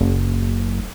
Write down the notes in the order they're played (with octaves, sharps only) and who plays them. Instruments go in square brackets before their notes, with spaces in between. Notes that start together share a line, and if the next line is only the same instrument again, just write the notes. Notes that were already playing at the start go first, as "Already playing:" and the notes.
[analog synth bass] F#1